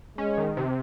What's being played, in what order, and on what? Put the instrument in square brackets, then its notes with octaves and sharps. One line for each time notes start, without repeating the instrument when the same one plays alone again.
[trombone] G#3 [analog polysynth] C#4
[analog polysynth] D#3
C3